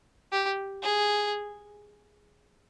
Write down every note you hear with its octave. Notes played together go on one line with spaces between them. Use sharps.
G4
G#4